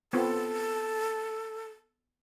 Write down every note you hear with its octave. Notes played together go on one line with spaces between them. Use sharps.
B3 C4 F4 A4